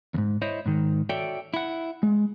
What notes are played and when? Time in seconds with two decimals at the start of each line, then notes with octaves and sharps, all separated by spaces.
0.14 D#2 G#2
0.42 E4 C5 C#5 D#5
0.66 G#2 D#3
1.09 F#4 A4 C#5 D5 E5 G5
1.54 E4 F#5
2.03 G#3